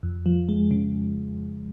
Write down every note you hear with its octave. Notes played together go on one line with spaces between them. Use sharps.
F2
F3
G#3
C#3